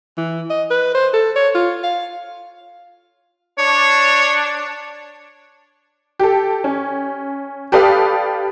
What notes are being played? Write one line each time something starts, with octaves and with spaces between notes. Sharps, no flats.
E3
D#5
B4
C5
A4
C#5
F4
F5
D4 C#5
G4 A4
C#4
G4 A4 B4 D5 F5 D#6